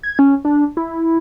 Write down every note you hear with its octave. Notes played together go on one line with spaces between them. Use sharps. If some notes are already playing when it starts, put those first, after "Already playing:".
G#6
C#4
D4
E4